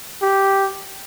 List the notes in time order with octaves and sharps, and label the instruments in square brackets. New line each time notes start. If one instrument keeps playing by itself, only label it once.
[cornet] G4